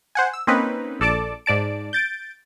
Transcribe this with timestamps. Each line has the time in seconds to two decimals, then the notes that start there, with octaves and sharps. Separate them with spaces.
0.15 C5 F#5 G#5
0.33 E6
0.47 A#3 C4 C#4 D#4 B4
1.00 A#1 A4 D5 A5 D6
1.46 G#2 D5 A5 D7
1.93 G6 A6 D7